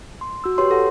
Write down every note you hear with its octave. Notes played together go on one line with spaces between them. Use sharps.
C6
F#4 E6
G4 B4 C#5 C6
A4 F#5